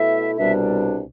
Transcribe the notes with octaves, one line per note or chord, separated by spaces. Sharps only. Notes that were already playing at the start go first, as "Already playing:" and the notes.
Already playing: B2 A3 E4 E5
C2 B2 G3 D4 E5